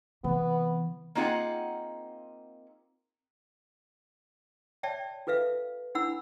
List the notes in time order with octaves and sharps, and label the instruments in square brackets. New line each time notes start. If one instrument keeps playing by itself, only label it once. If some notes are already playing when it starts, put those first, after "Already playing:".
[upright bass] C3 [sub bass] E3 [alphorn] B3
[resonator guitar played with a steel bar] A#3 C4 D#4 F4 G#4 F#5
[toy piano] C#5 D5 E5 G5 A5
F4 A4 B4 E5 F5
D4 E4 F#5 B5 E6